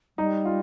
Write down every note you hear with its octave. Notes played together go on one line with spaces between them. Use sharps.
G3 D#4
F4